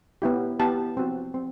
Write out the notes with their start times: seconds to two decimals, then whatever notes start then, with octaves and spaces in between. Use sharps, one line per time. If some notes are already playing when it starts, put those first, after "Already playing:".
0.22 B3 E4 G4
0.60 B3 E4 G4 A5
0.97 C4 F#4
1.34 C4